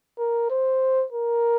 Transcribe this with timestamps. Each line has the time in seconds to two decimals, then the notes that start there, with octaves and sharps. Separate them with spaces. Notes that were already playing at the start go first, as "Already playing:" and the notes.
0.19 A#4
0.50 C5
1.12 A#4